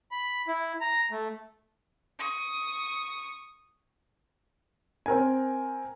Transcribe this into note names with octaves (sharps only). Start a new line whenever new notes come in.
B5
E4
A#5
A3
C#6 D#6
C4 A#4 G#5